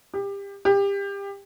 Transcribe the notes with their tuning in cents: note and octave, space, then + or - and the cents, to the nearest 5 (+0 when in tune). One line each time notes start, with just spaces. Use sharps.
G4 +25
G4 +25